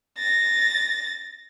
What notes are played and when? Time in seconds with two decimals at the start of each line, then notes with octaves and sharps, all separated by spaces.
0.18 A6 A#6